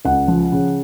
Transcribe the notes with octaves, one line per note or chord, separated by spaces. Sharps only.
C#2 F#5
F3
C#3